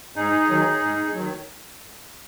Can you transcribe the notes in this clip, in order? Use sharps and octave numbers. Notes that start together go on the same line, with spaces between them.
G#2 D#4 G#4
D#3 F#3
G#2
D#3 F#3